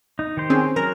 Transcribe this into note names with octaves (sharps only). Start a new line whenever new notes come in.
D#4
D#3 G4 C5
C4 C#4 G#4
F#3 A#4 A#5